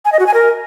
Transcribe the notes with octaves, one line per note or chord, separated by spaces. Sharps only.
G#5
D#5
F#4
G#5
A#4